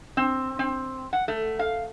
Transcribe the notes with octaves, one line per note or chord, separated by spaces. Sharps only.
C4
C4
F#5
A3
F5